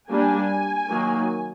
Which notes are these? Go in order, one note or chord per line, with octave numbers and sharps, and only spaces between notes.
G3 A#3 D4 G#5
D#3 F#3 A#3